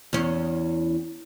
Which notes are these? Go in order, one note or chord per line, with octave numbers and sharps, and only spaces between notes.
E2 C#4